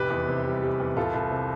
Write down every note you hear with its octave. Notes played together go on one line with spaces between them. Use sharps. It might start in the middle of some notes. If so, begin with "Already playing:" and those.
Already playing: F1 G4 B4
E2
C3
G3
G3
E2
C2 F4 A4
C2
C3